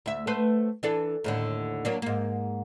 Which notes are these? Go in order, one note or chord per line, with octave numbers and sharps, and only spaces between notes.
D2 E5
A3 B4 C5
E3 D4 A4
D#2 A2 D3
F#3 A#3 D4
G#2 A#3